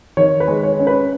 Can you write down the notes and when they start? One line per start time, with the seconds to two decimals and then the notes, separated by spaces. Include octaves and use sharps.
0.17 D#3 C#5
0.40 B4
0.48 G#3
0.63 C#5
0.80 C#4
0.87 B4